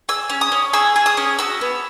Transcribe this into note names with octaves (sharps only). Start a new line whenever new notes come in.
G#4 E6
C#4
D#6
C#4
G#4 E6
G#4
D#6
C#4
F#4 E6
B3